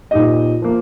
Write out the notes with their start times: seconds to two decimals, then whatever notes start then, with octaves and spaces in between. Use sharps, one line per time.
0.11 A#2 F3 D#4 G4 D#5
0.62 F3 A#3